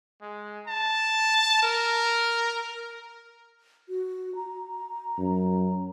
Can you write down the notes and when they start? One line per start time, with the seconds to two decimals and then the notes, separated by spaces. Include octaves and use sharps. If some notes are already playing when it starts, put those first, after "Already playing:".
0.22 G#3
0.67 A5
1.63 A#4
3.89 F#4
4.35 A#5
5.18 F#2